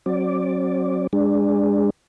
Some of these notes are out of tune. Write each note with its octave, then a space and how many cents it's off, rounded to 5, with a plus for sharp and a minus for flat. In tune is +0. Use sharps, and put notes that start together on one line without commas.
F#3 +0 C4 +45 D5 +0
G#3 -25 D4 +0